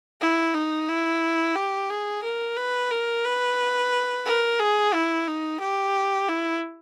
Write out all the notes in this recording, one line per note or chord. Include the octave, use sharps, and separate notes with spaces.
E4
D#4
E4
G4
G#4
A#4
B4
A#4
B4
A#4
G#4
E4
D#4
G4
E4